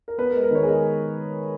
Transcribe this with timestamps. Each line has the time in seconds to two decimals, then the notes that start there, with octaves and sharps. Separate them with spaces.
0.08 A#4
0.18 B3 B4
0.31 A#4
0.35 G#3
0.43 A#4
0.51 D#3 C#5
0.63 G#4
0.68 G#3 A#4
0.85 G#3